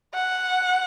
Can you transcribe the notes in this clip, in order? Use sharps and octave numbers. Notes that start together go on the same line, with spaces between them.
F#5